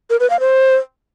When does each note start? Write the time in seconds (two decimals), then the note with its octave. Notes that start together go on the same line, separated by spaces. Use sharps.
0.10 A#4
0.20 B4
0.30 F5
0.40 C5